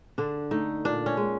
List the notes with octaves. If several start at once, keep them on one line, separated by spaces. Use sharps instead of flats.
D3 D4
A3 D#4
A#2 D4
C#4
G#3